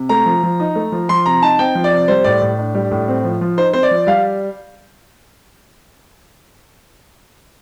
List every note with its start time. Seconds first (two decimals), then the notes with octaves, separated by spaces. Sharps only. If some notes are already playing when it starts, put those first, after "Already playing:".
Already playing: C3
0.09 A3 A#5
0.26 F3
0.43 F3
0.60 D#4
0.75 A3
0.92 F3
1.09 F3 C6
1.25 C3 A#5
1.42 D#4 A5
1.59 C4 G5
1.75 F3
1.84 D5
1.92 C3
2.08 G3 C5
2.24 A2 D5
2.41 A2
2.59 D4
2.75 G3
2.91 A2
3.08 C4
3.24 F3
3.41 F3
3.57 D#4 C5
3.73 C4 C5
3.83 D5
3.91 F3
4.07 G3 F5